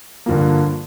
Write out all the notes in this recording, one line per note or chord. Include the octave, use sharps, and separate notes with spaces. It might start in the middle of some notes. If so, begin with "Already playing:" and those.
G2 D3 F3 A#3